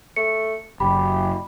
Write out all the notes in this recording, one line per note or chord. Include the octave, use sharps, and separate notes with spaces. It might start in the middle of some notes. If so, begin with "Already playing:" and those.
A3 C#7
F#1 G4 B5